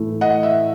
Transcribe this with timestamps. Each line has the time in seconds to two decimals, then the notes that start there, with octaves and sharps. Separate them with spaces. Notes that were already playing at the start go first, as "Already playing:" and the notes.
Already playing: A2 E3 A3
0.21 D#5 F#5
0.43 E5